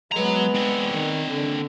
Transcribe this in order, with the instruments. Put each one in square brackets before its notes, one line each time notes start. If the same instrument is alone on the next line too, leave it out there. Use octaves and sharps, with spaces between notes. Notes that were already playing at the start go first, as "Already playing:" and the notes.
[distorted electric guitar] F#3 A#5 [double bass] G#3 B3
[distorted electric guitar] C4 D4
[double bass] D#3
D3